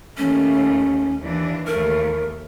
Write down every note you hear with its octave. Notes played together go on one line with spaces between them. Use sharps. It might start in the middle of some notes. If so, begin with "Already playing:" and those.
D#2 A3 C#4
D#2 E3 D4
D#2 A3 A#4